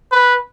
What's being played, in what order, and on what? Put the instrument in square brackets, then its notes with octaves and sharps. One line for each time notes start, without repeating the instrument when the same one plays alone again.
[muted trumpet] B4